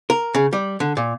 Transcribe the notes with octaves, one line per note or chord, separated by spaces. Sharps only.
A#4
C#3
G3
D3
A#2